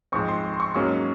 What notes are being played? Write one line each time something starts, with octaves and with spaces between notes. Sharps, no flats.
G#2 F3 C4 C#6
C6
C6
C6
C#6
G#2 F#3 A#3 C#4 C#6